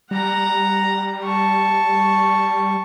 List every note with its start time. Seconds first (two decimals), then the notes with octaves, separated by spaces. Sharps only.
0.11 G3 F#5 A#5
1.24 A5 C#6